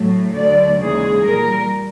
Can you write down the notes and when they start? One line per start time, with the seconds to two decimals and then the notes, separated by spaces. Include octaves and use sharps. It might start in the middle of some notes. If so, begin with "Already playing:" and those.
Already playing: A2 F#3 A3
0.35 D2 D3 F#3 D5
0.81 D#2 C#3 E3 G#3 G#4
1.25 A#2 G3 A#4